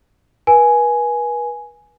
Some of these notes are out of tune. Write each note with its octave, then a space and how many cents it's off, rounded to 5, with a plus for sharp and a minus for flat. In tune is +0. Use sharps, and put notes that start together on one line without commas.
B4 -40 G#5 +10